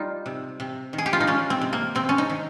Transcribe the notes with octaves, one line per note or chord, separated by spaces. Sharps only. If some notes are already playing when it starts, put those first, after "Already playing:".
Already playing: G3 D#4 F4
C3
C3
D#3
G#4
G4
F4
D#4
G#3 C#4
C4
C3
A#3
C3 C4
C#4
D#4
D#3